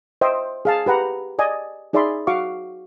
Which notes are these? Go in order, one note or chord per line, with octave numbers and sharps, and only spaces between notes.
C5 D#5 E5 G5
G#4 F5 A5
G4 B4 F#5 A#5
D5 D#5 G#5
D#4 G#4 D5 E5 B5 C6
F#4 F5 C#6 D6